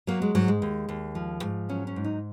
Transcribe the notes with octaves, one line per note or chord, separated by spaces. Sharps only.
F#3 A#3
G#3
G#2 F#3
G#3
D#2
D#2
F3
G#2
F#3 C#4
C#4
G#2
D#4